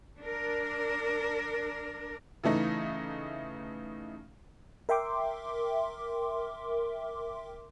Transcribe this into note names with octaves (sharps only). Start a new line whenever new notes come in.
D4 A#4
C#3 E3 A3 D#4
A#4 E5 G5 C6 D6